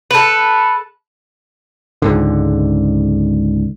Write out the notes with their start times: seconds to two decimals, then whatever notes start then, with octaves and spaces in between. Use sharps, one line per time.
0.11 A4 B4
2.02 C#2 G#2 D3